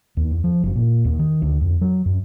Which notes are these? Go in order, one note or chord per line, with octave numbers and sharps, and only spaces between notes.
D#2
E2
F3
F#1
A#2
D#2
D#3
D2
F2
F#3
F#2